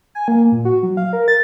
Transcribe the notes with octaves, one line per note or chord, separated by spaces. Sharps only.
G#5
A#3
A#2
F#4
F#3
F5
A#4
A6